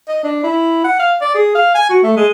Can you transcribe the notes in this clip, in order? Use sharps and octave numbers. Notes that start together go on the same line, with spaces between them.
D#5
D4
E4
F#5
F5
D5
G#4
F5
G#5
F#4
A3
G#3